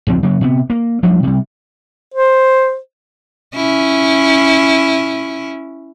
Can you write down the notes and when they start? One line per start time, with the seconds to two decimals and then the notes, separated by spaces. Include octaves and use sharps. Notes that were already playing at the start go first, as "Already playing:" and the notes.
0.07 D1 C#2 F3 C4
0.23 C#3 F#3 A#3
0.41 C3 B3
0.70 A#3
1.03 F3 G3 A3 D4
1.23 C3 G3
2.14 C5
3.56 C#4 E4